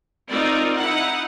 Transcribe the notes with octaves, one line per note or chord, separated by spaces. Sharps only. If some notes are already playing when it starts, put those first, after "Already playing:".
C4 D#4 F4 A#4 D5
D#4 E4 F#5